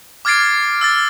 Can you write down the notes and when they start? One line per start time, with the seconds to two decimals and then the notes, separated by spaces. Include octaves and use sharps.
0.25 D6 F6 G#6 A6 C7 D7
0.81 E6 F6 A6